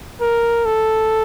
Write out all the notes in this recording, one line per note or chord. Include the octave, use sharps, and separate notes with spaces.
A#4
A4